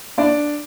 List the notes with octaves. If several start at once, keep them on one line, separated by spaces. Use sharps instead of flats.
D4 D5